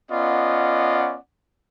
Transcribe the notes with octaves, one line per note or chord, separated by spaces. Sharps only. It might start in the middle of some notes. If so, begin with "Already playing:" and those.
B3 C#4 F4 D5 D#5 F#5